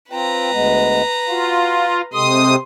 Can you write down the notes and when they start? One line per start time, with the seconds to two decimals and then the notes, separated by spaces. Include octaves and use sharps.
0.12 C4 F4 B4 G5 A#5
0.52 D2 G#3 B3
1.29 F4 F#4 F5
2.13 C3 G#3 G4 A4 C6 D#6